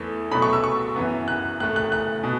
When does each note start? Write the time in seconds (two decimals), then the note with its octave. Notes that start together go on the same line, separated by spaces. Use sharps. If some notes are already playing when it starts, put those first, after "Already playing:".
Already playing: E2 E3 A3
0.31 B2 F#3 A3 B5
0.42 C#6
0.53 E6
0.64 C#6
0.96 F#2 E3 B3
1.28 F#6
1.60 A2 A3 F#6
1.76 F#6
1.92 F#6
2.24 B2